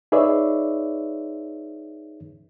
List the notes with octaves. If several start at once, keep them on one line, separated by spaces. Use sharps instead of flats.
D#4 G#4 B4 C#5 D5 E5